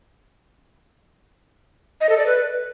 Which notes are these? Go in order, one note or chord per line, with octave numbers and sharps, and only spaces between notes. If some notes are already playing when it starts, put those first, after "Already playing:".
D#5
A4
D5
B4